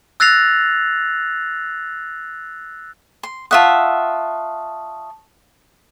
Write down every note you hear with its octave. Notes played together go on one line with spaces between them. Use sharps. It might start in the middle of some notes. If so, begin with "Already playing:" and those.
E6 F#6 A6 A#6 C7 F7
C6
F4 E5 F#5 A5 C#6 D#6